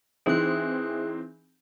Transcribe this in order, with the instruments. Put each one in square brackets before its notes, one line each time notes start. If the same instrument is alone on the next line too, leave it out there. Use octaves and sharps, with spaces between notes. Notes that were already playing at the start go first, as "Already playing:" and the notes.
[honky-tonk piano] E3 C4 D#4 [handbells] G#4 F#6